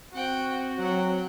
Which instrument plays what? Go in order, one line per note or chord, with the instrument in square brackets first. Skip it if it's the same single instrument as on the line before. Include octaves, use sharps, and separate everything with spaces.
[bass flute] C4 [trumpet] F#4 [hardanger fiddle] F#5 G5
[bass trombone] F#3 [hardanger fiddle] F#5 G5